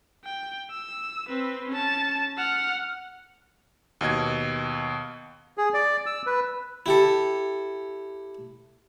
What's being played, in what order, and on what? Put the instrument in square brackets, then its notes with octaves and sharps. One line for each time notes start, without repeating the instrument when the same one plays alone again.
[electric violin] G5
E6
C4 B4
C#4 A5
F#5 F6
[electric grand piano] D#2 B2 D#5 G#6
[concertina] G#4
D5
E6
B4
[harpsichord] E4 G4 A4